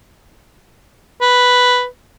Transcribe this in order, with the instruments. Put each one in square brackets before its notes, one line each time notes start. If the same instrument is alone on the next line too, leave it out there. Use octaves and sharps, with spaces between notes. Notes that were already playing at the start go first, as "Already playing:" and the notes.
[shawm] B4